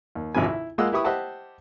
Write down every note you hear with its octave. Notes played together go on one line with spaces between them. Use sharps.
D#2
G#1 D2 C3 F3 G#5
E4
G#3 A#3 F4 D#5 F#5 E6
E4 G4 B4 C#6 D#6
G4 C5 D#5 E5 F#5 A5